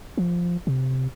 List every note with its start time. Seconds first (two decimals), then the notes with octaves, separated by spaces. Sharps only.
0.18 F3
0.67 C3